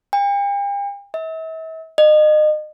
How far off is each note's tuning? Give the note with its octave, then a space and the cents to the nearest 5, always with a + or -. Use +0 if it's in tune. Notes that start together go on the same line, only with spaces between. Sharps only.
G5 +40
E5 -40
D#5 -30